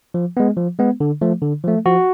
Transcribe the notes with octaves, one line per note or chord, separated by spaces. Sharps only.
F3
G#3 B3
F3
G#3 B3
D3
F3 A3
D3
F3 A3
F3 F#4